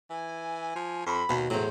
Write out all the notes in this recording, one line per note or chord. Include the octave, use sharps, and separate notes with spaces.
E3 G#5
F3
F2 B5
D#2 B2
E2 A2 F#3 C5